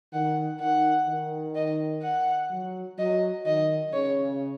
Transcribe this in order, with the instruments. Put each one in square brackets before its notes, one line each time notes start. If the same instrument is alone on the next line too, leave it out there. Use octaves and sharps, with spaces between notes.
[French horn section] D#3 [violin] F#5
[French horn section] D#3 [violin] F#5
[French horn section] D#3
[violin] D#5
F#5
[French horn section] F#3
[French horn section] F#3 [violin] D#5
[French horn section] D#3 [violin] D#5
[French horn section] C#3 [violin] C#5